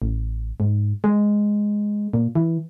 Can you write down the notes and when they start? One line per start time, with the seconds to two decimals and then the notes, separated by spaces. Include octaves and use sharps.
0.02 A1
0.60 G#2
1.04 G#3
2.13 A#2
2.35 E3